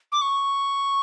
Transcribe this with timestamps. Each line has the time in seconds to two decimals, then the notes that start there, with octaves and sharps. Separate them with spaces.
0.12 D6
0.22 C#6